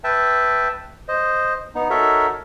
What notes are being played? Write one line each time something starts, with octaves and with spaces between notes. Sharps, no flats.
B4 E5 G5 A5
C5 D#5
B3 D#4
D#4 F#4 A4 A#4 C#5 E5